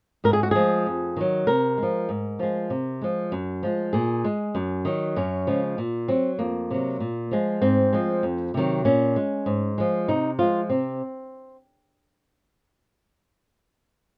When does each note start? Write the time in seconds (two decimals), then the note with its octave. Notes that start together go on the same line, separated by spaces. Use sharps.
0.24 G#2 A#4
0.33 G#4
0.43 F#4
0.51 F3 G#3 G#4
0.86 F2
1.16 D#3 F#3
1.47 C3 A#4
1.78 F3 G#3
2.09 G#2
2.39 F3 G#3
2.70 C3
3.01 F3 G#3
3.32 F#2
3.63 F3 G#3
3.93 A#2 G#4
4.25 G#3
4.55 F#2
4.85 D#3 F#3
5.16 F#2 C#4
5.47 C#3 F3 G#3
5.78 A#2
6.08 F#3 C4
6.39 F2 A#3
6.71 C3 F#3
7.00 A#2
7.31 F3 G#3
7.62 G#2 C4
7.93 F3 G#3
8.23 F2
8.54 C3 D#3 F#3
8.85 A#2 C#4
9.16 G#3
9.46 G#2
9.78 F3 G#3
10.08 C3 D#4
10.39 F3 G#3 F4
10.69 C3 C4